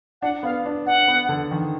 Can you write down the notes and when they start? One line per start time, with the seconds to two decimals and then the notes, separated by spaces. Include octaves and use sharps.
0.22 D4 F#5
0.43 B3 F5
0.65 D4
0.86 D4 F#5
1.08 B3
1.29 D3
1.51 D#3